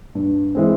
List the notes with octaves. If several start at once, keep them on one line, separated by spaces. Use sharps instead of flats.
G2
E3 G#3 C4